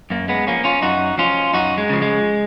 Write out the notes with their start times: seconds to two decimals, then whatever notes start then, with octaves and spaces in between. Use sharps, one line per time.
0.10 F#2 A#3
0.28 G#3 B3
0.47 F3 A#3 C#4
0.64 C#4 F4
0.82 F#2 D#4 F#4
1.18 F3 C#4 F4
1.53 F#2 D#4 F#4
1.78 G#3
1.90 C#3 F3
2.02 G#3